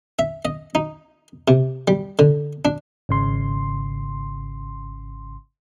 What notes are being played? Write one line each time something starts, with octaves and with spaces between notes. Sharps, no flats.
E5
D#5
D#4
C3
G3
D3
D4
G#1 C#3 C6